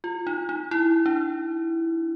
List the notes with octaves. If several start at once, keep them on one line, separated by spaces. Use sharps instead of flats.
F4
D#4
D#4
E4
D4